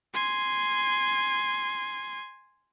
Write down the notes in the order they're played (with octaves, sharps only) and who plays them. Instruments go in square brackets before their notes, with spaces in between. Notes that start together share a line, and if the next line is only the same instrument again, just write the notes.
[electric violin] G#5 C6